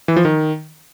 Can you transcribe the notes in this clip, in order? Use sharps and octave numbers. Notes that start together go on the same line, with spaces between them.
E3
F3
D#3